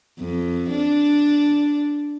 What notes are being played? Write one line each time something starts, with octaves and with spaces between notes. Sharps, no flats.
F2
D4